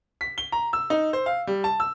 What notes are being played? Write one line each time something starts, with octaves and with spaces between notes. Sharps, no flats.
B6
G7
A#5
E6
D#4
C5
F5
G3
A5
E6